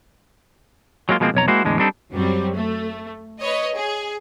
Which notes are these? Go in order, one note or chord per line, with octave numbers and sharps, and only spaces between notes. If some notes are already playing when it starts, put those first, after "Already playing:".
F#3 G#3 A#3 F4
B2 F3 G#3 A#3 C4
B1 F2 C#5 A#5
G#3 A#3 E4 F#4 C5
E2 A2 D3 G#3
G3 C4 D4 D#4 A4
F#2 F#3 G3 C4
A3
B4 C#5 D#5
G#4